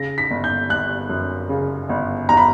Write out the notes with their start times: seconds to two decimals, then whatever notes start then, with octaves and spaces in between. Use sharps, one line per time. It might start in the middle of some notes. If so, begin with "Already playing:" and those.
Already playing: C#3 A#6
0.18 B6
0.30 G1
0.44 G6
0.70 G1 F#6
1.10 F#2
1.49 C#3
1.89 G1
2.29 G1 A#5
2.37 B5